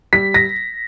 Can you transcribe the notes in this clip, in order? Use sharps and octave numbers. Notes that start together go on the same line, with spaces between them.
G3 B6
A#6